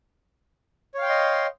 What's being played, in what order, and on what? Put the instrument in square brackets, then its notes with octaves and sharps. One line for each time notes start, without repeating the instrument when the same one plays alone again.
[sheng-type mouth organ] C#5
F5
G5
C6
D#5